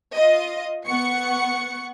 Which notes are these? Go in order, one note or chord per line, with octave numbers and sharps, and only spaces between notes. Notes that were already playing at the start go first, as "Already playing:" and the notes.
F4 D#5
B3 F#5 C#6 C#7